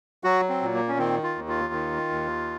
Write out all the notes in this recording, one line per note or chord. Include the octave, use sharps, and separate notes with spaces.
F#3 F#4
C4
A#2
A#3
C#4
D#3 C4
F4
D#2
F4
D#3
D#2